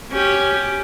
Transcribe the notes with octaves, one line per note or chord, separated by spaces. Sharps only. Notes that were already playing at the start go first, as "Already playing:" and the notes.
C#4 G4